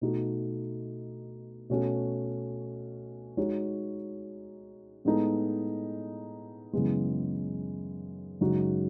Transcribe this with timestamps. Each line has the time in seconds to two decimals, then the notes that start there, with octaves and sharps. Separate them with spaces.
0.01 B2 A3 D#4 F#4
1.70 B2 A3 C#4 F#4
3.37 G#3 D#4 F#4 C#5
5.05 A2 G#3 B3 D#4 A4
6.73 F#2 C#3 E3 G#3 B3
8.41 F#2 C#3 G#3 D#4 F#4